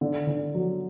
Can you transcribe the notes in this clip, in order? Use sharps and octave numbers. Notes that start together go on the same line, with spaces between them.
D3
D3
F#3